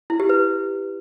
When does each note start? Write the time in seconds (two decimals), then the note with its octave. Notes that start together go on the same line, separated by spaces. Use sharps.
0.10 E4
0.20 G4
0.29 B4